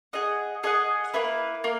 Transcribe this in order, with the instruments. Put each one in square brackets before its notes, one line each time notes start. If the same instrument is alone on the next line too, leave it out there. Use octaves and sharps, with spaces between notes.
[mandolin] G#4 D#5 F#5
G#4 D#5 F#5
A#3 E4 B4
A#3